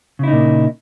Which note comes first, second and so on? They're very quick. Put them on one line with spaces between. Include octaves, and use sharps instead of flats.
C#3 E4 D#4 A#2